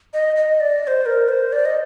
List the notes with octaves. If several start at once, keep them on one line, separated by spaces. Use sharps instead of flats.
D#5
D#5
D5
D5
C5
A#4
C5
D5
D#5